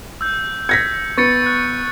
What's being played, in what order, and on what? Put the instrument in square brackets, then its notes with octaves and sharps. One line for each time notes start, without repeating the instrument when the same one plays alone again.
[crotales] E6 G6
[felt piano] G#6 A#6 B6 [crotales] C#7
[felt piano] B3 [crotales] C#6 A6 C#7
[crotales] F#6